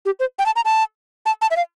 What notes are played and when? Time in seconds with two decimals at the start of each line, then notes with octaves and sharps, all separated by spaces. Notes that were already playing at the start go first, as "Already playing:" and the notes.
0.05 G4
0.20 C5
0.39 G5
0.46 A5
0.56 A#5
0.65 A5
1.26 A5
1.42 A5
1.51 E5
1.57 F5